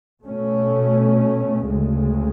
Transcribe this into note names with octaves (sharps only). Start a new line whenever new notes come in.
B2 A3 C#4
D2 C#3 G#3